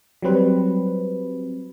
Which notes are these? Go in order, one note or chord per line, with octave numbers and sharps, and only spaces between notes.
F#3 G3 C4 B4